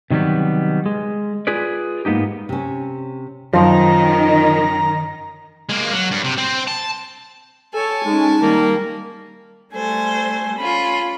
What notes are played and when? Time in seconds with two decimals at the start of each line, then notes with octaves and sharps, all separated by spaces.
0.10 C3 D#3 F#3 G3 B3
0.86 G#3
1.47 F4 G#4 B4 D5
2.05 G#2 A#3 B3 D#4 G4
2.49 C3 C#4
3.54 F#2 D#3 F3 F5 A#5
5.69 G#3 A#3
5.93 F#3
6.11 G2
6.24 C3
6.38 C4 C5
6.67 A5
7.73 A4 C#5 G#5 A5
8.05 G#3 C#4 D#4
8.42 D#3 G3 A#3
9.74 G3 A3 A4 C5 G#5
10.58 C#4 F4 B5